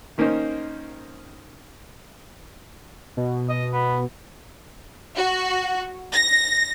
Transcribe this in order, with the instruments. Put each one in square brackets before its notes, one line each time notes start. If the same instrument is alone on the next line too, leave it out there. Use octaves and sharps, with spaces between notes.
[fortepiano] D#3 A#3 C#4 D#4 C5
[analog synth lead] B2
[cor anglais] D#5
B3
[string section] F#4
A#6